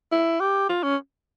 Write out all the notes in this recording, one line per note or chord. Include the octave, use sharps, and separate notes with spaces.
E4
G4
F4
C#4